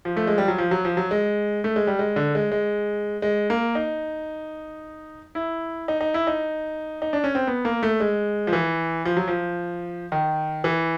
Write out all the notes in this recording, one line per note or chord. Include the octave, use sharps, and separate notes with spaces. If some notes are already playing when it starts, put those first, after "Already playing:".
F3
A3
G#3
G3
F#3
F3
F#3
F3
F#3
G#3
A3
G#3
G3
G#3
D3
G#3
G#3
G#3
A#3
D#4
E4
D#4
D#4
E4
D#4
D#4
D4
C#4
C4
B3
A#3
A3
G#3
F3
E3
F3
F#3
F3
D#3
E3